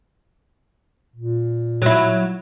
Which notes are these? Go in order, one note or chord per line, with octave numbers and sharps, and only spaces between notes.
A#2
F#3 E4